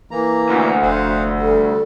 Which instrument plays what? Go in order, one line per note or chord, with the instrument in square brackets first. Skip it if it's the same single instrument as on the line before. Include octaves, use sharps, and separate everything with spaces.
[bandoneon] E3 A#3 A#5
[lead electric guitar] D2
[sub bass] F1 [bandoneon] C5 F5 F#5
[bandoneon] G3 [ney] A4